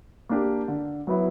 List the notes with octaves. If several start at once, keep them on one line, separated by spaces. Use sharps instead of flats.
A#3 D4 G4
D3
F#3 B3 E4